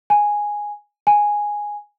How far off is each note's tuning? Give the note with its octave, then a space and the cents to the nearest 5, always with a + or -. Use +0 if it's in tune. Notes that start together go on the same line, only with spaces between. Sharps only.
G#5 -5
G#5 -5